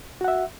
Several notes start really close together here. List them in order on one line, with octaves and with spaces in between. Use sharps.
F#4 F#5 E5